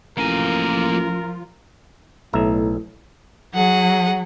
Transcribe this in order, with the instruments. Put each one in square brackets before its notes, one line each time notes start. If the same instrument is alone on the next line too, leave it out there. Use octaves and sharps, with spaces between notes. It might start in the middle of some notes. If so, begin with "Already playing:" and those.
[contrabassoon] A1 [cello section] F3 F4 [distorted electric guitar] A#3 G#5 [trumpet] A#4
[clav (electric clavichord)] B1 E5 A#5 [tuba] A2
[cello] F#3 [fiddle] G#4 F#5